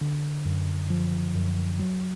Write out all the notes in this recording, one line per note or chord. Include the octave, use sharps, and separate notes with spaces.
D3
F#2
F3
F#2
F#3